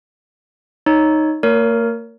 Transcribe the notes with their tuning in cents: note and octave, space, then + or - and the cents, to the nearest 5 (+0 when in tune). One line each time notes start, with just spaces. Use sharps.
D#4 +0 C#5 +0
A#3 -40 A#4 +0 C#5 +30